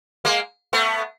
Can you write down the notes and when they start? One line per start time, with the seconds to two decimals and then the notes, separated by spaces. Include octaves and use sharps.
0.25 G#3 A#3
0.73 A3 B3